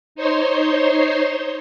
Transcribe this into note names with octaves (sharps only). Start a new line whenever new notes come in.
D#4 C5 C#5 C6